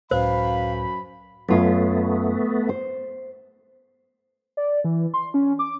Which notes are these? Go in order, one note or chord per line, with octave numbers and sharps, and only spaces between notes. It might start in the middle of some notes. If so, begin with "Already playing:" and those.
C#2 F#2 A2 B4 C5 F5 B5
F#2 A3 B3 F4
C5
D5
E3
C6
C#4
D6